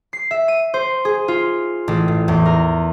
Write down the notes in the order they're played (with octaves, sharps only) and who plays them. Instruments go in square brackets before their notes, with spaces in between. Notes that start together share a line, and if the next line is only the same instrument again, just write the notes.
[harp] C7
E5
D#7
C5
G#4
F4
A1
A2
E2
A#4